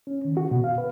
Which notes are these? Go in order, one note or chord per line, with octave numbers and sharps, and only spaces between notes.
C#4
D#3
F#4
B2
F5
B4